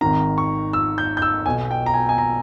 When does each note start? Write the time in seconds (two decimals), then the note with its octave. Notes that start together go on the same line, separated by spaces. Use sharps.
0.01 G#1 G#2 D#3 A#5
0.38 C#6
0.73 E6
0.98 G6
1.17 G6
1.22 E6
1.46 B1 B2 G#5
1.71 G5
1.86 A#5
1.94 G#5
2.09 G#5
2.18 A#5